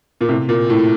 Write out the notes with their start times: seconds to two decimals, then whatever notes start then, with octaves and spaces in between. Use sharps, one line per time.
0.21 A#2
0.28 A2 C3
0.49 A#2
0.70 A2